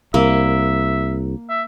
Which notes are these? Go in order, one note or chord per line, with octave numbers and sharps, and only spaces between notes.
C2 A#3 E5
E5